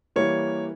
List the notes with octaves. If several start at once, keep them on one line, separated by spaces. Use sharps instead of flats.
E3 G3 A#3 C#5